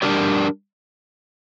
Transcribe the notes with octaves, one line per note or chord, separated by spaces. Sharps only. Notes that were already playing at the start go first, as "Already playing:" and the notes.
G3 D4 G4 A#4 D5